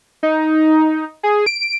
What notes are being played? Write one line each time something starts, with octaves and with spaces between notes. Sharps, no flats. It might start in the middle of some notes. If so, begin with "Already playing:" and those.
D#4
G#4
D7